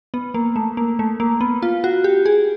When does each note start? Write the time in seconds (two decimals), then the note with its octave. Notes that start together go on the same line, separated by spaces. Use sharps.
0.14 B3
0.34 A#3
0.56 A3
0.77 A#3
0.99 A3
1.20 A#3
1.41 B3
1.62 F4
1.84 F#4
2.04 G4
2.26 G#4